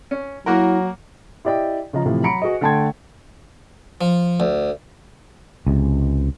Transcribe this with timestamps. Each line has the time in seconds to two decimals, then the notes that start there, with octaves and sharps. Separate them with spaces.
0.11 C#4
0.46 F#3 A#3 E4 F#4 A#4
1.45 E4 G4 D5 D#5 G5
1.93 C#3 F3 D#5 A#5
2.06 A2 C3 E3 F3
2.23 F#3 F#4 A#5 B5 C#7 D7
2.42 F#4 G#4 B4 D#5
2.61 D3 A3 G5 A5 C6 G#6
4.01 F3
4.40 D2
5.67 C#2 C3